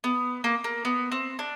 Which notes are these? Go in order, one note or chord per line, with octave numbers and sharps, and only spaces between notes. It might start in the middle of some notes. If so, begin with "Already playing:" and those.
B3
A#3
A#3
B3
C4
D4